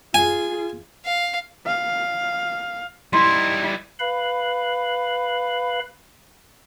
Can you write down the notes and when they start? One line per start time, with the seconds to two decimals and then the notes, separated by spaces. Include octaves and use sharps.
0.14 F4 G#4 G#5
1.05 F5
1.66 F5
3.13 G3 D#4 E4 C6
3.99 B4 F5 B5